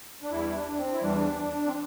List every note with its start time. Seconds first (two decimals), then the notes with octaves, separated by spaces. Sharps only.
0.22 D4
0.31 E2 E3 G3 E4
0.55 D4
0.78 C4
0.93 E4
1.02 E2 E3 G3 D4
1.67 C4